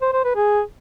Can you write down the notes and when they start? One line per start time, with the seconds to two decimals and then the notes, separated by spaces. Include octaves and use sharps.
0.02 C5
0.13 C5
0.24 B4
0.36 G#4